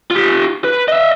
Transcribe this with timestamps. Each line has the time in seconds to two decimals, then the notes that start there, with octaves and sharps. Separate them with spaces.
0.11 F4 G4
0.64 B4
0.88 D#5 E5